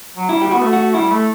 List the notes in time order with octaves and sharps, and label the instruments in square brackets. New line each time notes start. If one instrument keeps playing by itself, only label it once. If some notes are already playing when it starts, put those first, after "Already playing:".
[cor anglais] F#3
[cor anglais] G3 [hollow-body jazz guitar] E4
[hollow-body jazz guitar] G4
[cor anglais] B3 [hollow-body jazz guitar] F#4
[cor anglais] A3
[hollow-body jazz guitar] F#4
[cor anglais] G3 [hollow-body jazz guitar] E4
[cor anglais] A3